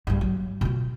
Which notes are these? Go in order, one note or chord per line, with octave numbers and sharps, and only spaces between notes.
A#1 G2
F#3
B2 F4